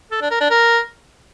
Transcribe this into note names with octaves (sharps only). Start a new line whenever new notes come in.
A4
D4
A#4
D4
A#4